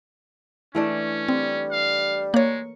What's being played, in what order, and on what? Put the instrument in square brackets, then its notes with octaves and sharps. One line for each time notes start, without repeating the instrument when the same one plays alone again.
[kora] E3 A3 D4 [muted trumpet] C#4
[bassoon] G3 [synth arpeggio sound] C4
[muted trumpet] F5
[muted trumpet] G#3 [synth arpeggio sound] A#3 C#5